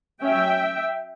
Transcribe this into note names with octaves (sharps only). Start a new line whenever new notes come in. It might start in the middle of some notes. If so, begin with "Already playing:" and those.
F#3 C#4 E5 G5